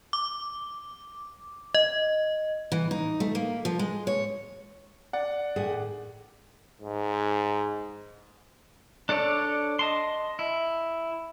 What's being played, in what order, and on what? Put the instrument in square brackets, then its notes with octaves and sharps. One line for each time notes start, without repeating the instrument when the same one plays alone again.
[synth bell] D6
D#5
[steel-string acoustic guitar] E3
D#4
A3
A#3
F3
G#3
C#5
[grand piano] D5 F#5
[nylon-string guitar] A2 D#3 G#4
[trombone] G#2
[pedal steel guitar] D4 A4 C#5 D5
D#5 A5 C6
E4